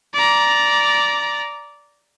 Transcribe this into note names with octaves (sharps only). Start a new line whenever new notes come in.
D5 A#5